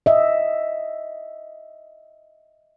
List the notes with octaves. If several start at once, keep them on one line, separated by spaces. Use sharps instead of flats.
D#5 E5